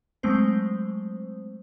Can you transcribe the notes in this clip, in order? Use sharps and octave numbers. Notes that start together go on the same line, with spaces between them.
F#3 G#3 A3 C4 C5